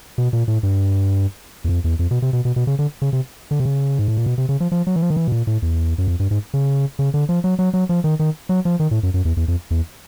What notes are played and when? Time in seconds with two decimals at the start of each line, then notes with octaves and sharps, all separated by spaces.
0.18 B2
0.33 A#2
0.48 A2
0.63 G2
1.64 E2
1.69 F2
1.84 E2
1.99 F2
2.11 B2
2.22 C3
2.33 B2
2.45 B2
2.56 B2
2.67 C#3
2.79 D3
3.02 C#3
3.13 C3
3.51 D3
3.60 C3
3.65 C#3
3.99 G#2
4.08 A2
4.17 A#2
4.26 B2
4.38 C3
4.49 C#3
4.60 F3
4.72 F3
4.87 F#3
4.96 E3
5.02 F3
5.10 D#3
5.17 E3
5.28 B2
5.32 A#2
5.47 A2
5.62 E2
5.98 F#2
6.08 F2
6.20 G2
6.31 G#2
6.54 C#3
6.99 C#3
7.14 D3
7.29 F3
7.44 F#3
7.59 F#3
7.74 F#3
7.89 F3
8.04 D#3
8.19 D#3
8.49 F#3
8.65 F3
8.80 D#3
8.91 A2
9.03 F#2
9.14 F#2
9.25 E2
9.37 E2
9.48 F2
9.71 E2